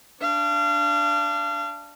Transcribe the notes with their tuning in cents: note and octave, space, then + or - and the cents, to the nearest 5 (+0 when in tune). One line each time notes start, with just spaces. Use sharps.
D4 +0 F5 -30